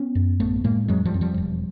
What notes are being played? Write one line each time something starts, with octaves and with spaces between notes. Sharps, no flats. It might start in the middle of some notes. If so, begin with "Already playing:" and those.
Already playing: B3 C#4
F#2
A1 A3 B3
A2 G#3 A#3
F2 F#3 G#3
F3 G3
F2
F3 G3
E1